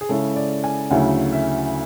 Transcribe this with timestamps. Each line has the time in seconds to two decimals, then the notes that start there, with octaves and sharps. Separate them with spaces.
0.01 G#4
0.09 C#3 G#3 C#4 E4 A4
0.36 D5
0.64 G#5
0.90 D2 C#3 F#3 A3 E4 F#5
1.32 E5